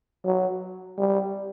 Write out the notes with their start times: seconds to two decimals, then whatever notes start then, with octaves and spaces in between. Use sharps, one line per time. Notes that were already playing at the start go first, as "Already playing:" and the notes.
0.25 F#3
0.98 G3